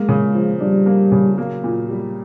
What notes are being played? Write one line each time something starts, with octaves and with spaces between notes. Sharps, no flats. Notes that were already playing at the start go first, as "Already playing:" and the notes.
Already playing: G#3 A#3
C#3
F3
G3 D4
A#3
C#3
F#3 A#3
A#2
G3